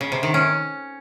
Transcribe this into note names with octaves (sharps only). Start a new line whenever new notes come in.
C#3
C3
D#3
C#4